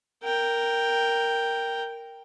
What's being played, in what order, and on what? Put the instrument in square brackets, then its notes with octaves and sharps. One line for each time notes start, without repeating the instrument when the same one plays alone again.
[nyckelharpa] A#4 G5